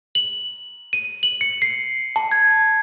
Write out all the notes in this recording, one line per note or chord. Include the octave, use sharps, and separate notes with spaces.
F#7
D#7
F#7
C#7
C7
A5
G#6